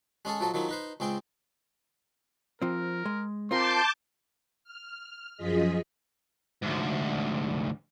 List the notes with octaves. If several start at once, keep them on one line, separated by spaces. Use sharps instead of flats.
G#3 C#4 G#4 A4
F3 F#3 A4 D#5
D#3 F3 F#3 D#4 E4
D#4 B4 C5
C#2 C4 G#4 G5
F3 C4 A#4
G#3
C4 F4 A#4 A5 C6 D6 G6
F6
F#2 F3 F4 G#4 D#5 B6
D2 G#2